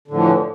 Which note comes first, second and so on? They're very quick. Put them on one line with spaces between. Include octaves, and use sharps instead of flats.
D3 A2 F3 E3